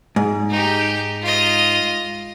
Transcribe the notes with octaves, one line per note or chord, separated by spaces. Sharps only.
G#2
D#4 G4
F4 D#5